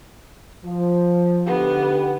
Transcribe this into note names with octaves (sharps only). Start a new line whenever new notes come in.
F3
D3 B3 D#4 G4